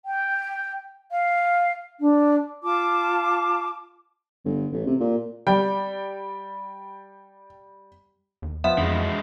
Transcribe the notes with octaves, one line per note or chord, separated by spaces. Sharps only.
G5
F5
D4
F4 A5 D6
G1
A1
C3
A#2
G3 G5
D#2
F3 B3 E5
F2 E3 G#3